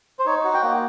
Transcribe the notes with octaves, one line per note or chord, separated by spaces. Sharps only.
C5
D#4 C#5
F#4
G5
A#3